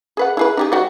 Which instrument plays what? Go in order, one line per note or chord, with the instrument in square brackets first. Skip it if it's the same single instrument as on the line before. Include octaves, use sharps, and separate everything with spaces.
[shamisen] G#4 B4 F#5
E4 G#4 B4
D#4 G4 G#4
G3 F#4 C5